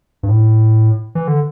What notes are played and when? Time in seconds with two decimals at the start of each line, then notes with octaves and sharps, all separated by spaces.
0.23 G2
0.29 A2
1.15 E3
1.28 D3